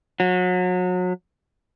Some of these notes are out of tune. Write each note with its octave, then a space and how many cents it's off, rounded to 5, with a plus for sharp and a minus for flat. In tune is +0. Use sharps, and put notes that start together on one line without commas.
F#3 -30